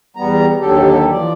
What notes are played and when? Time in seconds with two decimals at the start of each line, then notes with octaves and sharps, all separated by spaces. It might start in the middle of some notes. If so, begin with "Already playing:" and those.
0.16 E2 G3 B3 A#5
0.60 D#2 D3 F#3 G4 A4
1.11 E3 F3 D5